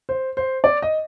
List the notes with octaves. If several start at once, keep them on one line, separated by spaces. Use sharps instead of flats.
C5
C5
D5
D#5